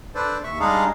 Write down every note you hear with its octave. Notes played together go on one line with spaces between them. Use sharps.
D4 A4 B4 C5 D5
D#2 E5 C#6
G3 G#3 D4 D#4 G#4 F5